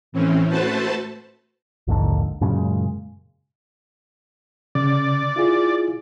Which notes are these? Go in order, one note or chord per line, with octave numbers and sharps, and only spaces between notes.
A2 E3 C4 C#4
A3 F#4 B4 C5 A5
A#1 D#2 G#2 D3
F#2 A#2 C#3 G#3
C#3 D5
E4 F4 G#4